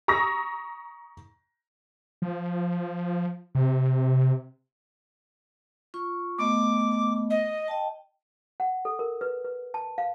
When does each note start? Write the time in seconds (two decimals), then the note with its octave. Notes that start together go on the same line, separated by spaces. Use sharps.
0.08 A#5 C#6 D#6 E6 A#6
2.22 F3
3.55 C3
5.94 F4 C#6
6.38 A3 B3 D#5 D6
7.30 D#5
7.68 D#5 G5 A5
8.60 F#5
8.85 A4
8.99 A#4
9.21 B4
9.45 B4
9.74 A5
9.98 F5